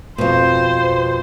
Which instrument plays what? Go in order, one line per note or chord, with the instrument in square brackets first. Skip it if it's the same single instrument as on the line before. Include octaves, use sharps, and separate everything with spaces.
[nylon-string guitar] F2 B2 [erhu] C5